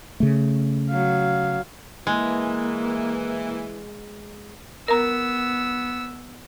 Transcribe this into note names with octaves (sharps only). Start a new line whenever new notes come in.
C#3 A3
F#3 F5
E3 G#3 A#3
B3 A#4 A#5 E6